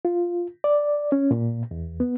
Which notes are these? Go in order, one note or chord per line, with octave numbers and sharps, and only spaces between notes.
F4
D5
C#4
A#2
E2
B3